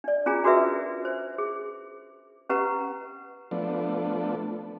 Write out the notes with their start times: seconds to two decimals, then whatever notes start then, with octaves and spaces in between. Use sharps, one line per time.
0.04 D4 D5
0.26 C#4 D4 F4 G#4 G#5 A#5
0.44 D4 F#4 G#4 A#4 B4 E5
1.05 C5
1.38 G#4
2.49 C#4 G4 B4 F#5 A#5
3.51 F3 A3 B3 D4